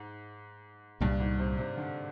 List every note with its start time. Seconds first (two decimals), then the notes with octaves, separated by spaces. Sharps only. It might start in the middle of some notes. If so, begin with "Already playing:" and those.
Already playing: G#2
1.01 C2 G2 A#2 G3
1.20 G#2
1.39 C3
1.58 C3
1.77 D3